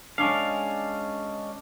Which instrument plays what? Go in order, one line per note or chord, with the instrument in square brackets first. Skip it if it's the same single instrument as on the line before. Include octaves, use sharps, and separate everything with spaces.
[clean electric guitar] G#3 C#4 F5 [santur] D4